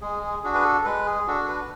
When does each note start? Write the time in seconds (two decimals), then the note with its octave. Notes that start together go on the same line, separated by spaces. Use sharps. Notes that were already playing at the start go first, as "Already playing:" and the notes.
0.01 G#3 G#4
0.23 G#4
0.43 D4 F#4 G#4
0.55 B4
0.64 A4
0.85 G#3 B4
1.06 G#4
1.27 D4 F#4 A4
1.42 A4
1.48 B4